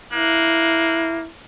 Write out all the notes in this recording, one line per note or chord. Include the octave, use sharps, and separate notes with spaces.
A#3 E4 F#6